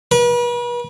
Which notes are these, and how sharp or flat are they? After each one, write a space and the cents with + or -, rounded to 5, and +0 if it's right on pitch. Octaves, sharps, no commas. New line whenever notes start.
B4 -40